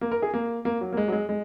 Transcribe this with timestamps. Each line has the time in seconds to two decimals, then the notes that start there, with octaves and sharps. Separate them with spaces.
0.01 A#3
0.11 A#4
0.22 G#4
0.34 A#3
0.65 A#3
0.81 F#3
0.93 A#3
0.97 G#3
1.08 F#3
1.12 G#3
1.29 G#3